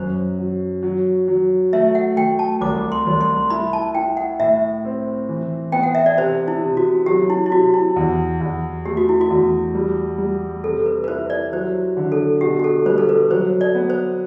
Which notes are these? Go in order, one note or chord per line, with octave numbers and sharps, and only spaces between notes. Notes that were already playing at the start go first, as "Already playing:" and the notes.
Already playing: F#2 C5
F#3
F#3
F#3
A3 E5
F#5
A3 G5
A5
C2 D6
C6
C2
C6
E4 B5
A5
E4 G5
F#5
A2 E5
C4
E3
B3 G5
F#5
E5
D5
C3 C5
E4
C3
F#4
F#3 G4
E4
E4
C3 F#4
E4
E2
E2
A3 G4
F#4
E4
F#4
E2
G3
G3
C3 A4
B4
B4
E4 C5
D5
F#3 C5
D3
A4
B2 G4
G4
A4
G3 C5
A4
B4
F#3 C5
D5
B3
C5